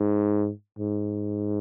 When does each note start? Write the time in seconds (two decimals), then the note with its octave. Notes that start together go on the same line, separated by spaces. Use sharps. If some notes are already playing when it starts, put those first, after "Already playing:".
Already playing: G#2
0.79 G#2